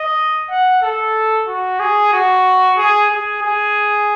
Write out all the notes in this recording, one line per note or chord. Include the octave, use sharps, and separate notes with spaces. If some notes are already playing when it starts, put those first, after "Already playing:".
Already playing: D#5
F#5
A4
F#4
G#4
F#4
G#4
G#4
G#4